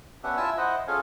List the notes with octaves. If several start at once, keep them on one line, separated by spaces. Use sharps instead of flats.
B3 C#4 D4 G4 E5 F#5
E4 F4 E5 G#5 A5 E6
E4 C5 D#5 F#5
C#4 F4 G#4 A4 F5 G#5